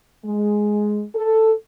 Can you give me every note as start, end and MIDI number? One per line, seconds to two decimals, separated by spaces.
0.25 1.02 56
1.15 1.51 69